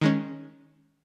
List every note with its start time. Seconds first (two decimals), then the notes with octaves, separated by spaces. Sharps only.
0.01 D#3 G#3 C#4